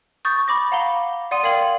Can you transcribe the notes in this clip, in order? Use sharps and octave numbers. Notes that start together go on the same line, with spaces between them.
C#6 D#6 G6 A6
B5 D6 A#6
F5 F#5 A#5 B5 G7
D5 F#5 C6 D#6 D#7
A#4 D5 F5 G5 G#6 F#7